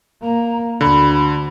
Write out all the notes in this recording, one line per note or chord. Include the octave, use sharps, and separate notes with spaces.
A#3 A#5
D2 D3 B5